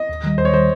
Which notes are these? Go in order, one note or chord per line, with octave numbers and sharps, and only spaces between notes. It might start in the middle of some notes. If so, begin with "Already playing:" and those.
Already playing: D#5
D#2
D#3 G3
D#2 C5
C#5
D#3 G3 C5